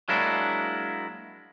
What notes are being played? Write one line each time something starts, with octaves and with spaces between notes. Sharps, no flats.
F#3 G#3 A#3 D4 E4